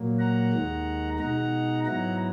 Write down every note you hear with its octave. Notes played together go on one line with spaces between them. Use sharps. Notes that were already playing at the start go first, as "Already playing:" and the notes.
Already playing: A#2 F#3 A#3
F#5 A#5
D#2 D#3 G#3
B2 G#3 D#4 F#5 A#5
G#2 F#3 B3 E4 F#5 A#5